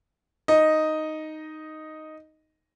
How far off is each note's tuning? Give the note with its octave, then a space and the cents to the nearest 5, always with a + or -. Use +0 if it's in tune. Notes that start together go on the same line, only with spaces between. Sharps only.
D#4 +0 D#5 +0